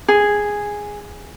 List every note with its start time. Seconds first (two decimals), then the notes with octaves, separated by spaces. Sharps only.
0.08 G#4